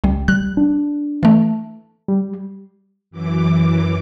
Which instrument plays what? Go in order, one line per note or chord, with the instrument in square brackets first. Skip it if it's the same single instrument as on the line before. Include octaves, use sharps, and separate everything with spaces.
[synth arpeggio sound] C#2 G3
[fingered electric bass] G3 [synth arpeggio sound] F#6
[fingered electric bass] D4
[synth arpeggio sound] E3 A3
[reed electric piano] G3
[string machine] F#2 E3 D6